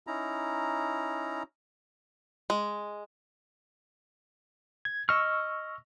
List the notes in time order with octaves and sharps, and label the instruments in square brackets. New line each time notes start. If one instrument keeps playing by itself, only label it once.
[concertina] C#4 D#4 E4 A#5
[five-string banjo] G#3
[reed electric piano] G#6
[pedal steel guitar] D#5 F6 [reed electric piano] C#6 E6